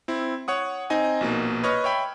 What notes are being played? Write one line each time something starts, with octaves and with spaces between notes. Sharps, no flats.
C4 E4
C#5 F#5 D#6
C4 D#4 D#5 G#5
A#1 B2 A#3
B4 C#5 D#5 C#6 F6
C#5 E5 G5 B5